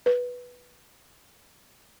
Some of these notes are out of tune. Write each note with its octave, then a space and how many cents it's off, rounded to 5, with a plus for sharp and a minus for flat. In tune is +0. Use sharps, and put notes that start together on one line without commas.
B4 -5